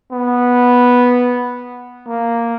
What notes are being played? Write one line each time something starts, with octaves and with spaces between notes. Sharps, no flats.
B3
A#3